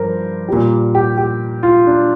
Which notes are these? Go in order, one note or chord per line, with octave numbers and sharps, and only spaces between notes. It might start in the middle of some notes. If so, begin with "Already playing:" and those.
Already playing: G2 F3 A#4 C5
A#2 G3
G4
G4
F4
D4